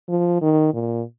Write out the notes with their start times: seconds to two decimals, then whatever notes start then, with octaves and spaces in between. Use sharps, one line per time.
0.09 F3
0.42 D#3
0.74 A#2